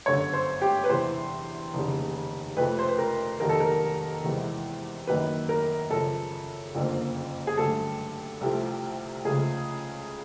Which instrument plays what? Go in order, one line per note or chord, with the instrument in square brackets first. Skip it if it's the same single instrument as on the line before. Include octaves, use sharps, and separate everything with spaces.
[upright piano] G1 F#2 D3 C#5
C5
G4
B4
E2 C3 E3 C5
F1 D#2 C#3
F2 C3 F3 A3 B4
C5
B4
A#4
F1 D#2 D#3 F#3 A#4
A4
A#4
E2 C3 E3 G#3
F#2 D#3 F#3 A#3 B4
A#4
F#2 C#3 F3 A4
F#1 F2 D3 F3 A#3
G#4
G2 D3 F#3 A3 A4
C2 C3 F3 A3
C#2 C#3 F3 A3 G#4